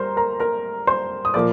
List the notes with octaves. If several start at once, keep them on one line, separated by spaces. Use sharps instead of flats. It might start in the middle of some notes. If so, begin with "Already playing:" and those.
Already playing: G3 A#4 C5 A#5 C6
A#4 A#5
A#4 A#5
C5 C6
D#6
A#2 F3 A#3 D5 D6